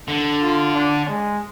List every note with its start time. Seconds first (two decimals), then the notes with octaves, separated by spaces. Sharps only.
0.08 D3
0.42 F4
0.75 D4
1.08 G#3